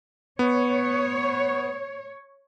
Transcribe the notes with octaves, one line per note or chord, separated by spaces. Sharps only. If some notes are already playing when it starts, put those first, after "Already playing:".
B3 C#5